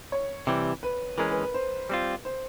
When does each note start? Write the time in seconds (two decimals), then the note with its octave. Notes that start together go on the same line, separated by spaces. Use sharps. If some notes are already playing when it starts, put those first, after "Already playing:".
0.12 C#5
0.47 C3 E3 G3
0.83 B4
1.18 E3 G#3 C#4 A#4
1.30 B4
1.42 B4
1.54 C5
1.90 G3 C4 F4
2.25 C5